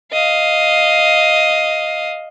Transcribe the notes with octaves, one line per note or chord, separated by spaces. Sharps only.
D#5 F5